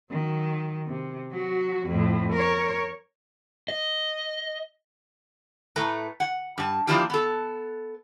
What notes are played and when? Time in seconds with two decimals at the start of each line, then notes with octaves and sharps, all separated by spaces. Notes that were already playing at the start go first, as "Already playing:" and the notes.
0.11 D#3 F#3
0.87 C3
1.32 F#3 F#4
1.87 F2 A2
2.33 A#4 C#5
3.68 D#5
5.76 A2 A3 B4 A#5
6.20 F#5
6.58 G2 A5
6.87 F3 A#3 D4 E4 F4 G4
7.10 B3 A4